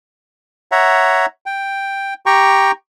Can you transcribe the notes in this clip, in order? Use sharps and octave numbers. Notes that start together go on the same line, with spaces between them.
C#5 E5 F#5 A#5
G5
G4 G5 A#5 C#6